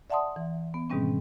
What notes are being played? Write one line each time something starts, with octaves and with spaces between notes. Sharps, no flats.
D5 E5 F#5 A5 C6 D#6
E3
B3
G#2 B2 D#3 G3 C4 C#4